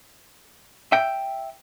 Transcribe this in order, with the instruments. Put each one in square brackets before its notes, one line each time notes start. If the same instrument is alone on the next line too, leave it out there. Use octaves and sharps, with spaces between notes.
[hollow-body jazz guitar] E5 G5